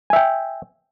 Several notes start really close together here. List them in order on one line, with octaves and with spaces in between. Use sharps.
G#5 E5 G5